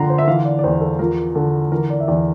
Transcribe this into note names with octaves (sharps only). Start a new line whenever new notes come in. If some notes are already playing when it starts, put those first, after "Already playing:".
Already playing: D3 F3 A#5 C6
C5
E5
E3 F5
D5
D5
E2 C5
A4
F3 A#4
D3 A4
E3 A#4
D5
E5
E2 D5